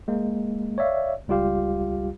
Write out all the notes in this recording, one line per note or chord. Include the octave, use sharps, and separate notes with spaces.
G#3 A#3
C#5 D5 E5 F5
C#2 G3 F4 G4 F5